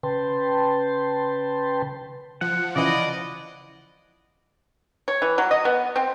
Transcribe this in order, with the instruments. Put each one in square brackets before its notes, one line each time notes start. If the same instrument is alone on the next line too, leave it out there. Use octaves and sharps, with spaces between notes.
[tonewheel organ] C#3 B4 G5 A5 C6
[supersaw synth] F3 [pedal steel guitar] F#5
[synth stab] C#3 E3 [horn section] E4 D5 D#5
[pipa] C#5
E3
F#3
D#5
B3
C4